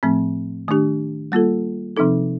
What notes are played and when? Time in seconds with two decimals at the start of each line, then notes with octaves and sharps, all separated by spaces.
0.03 A2 F3 A3 C4
0.68 D#3 A3 D4 G4
1.32 G3 A#3 F4 A4
1.97 C3 F3 C4 D#4 A4